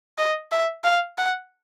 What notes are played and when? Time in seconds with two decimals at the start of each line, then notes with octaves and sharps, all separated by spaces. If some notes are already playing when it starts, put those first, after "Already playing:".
0.18 D#5
0.52 E5
0.84 F5
1.18 F#5